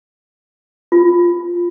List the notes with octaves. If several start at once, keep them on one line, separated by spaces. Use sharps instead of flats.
F4